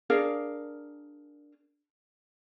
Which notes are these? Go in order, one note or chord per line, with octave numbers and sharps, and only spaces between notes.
D4 G#4 A#4 F5